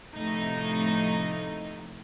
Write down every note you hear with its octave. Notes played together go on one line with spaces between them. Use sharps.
A2 C3 F3 A3 D#4